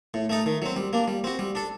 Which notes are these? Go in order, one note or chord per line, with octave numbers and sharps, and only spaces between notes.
A2
A3 D#4 A4
D#3
F#3 C4
G3
A#3 D4
G3
C4 F#4
G3
D4 A4